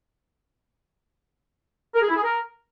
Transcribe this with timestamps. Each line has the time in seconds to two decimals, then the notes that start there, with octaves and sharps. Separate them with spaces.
1.94 A#4
2.02 G#4
2.09 E4
2.16 G#4
2.23 A#4